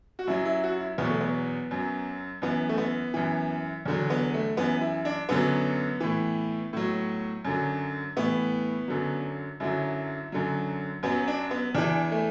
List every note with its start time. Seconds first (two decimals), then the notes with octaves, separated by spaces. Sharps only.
0.19 F#4
0.27 F#2 F#3 E4
0.45 E4
0.63 F#4
0.80 E4
0.98 E2 B2 F#3 B3
1.10 A3
1.20 B3
1.71 F#2 F#3
2.42 F#2 E3 B3
2.69 A3
2.78 B3
3.14 F#2 E3
3.85 E2 D3 F#3
4.10 B3
4.34 A3
4.57 F#2 E3 B3
4.81 E4
5.05 D4
5.29 F#2 D3 F#3 B3
6.00 A2 E3
6.73 A2 F#3
7.45 F#2 D3 F#3
8.16 A2 E3 B3
8.88 F#2 D3 F#3
9.60 F#2 D3 F#3 E4
10.32 F#2 D3 F#3
11.03 F#2 F#3 B3
11.28 D4
11.51 B3
11.74 E2 E3 D4
12.12 A3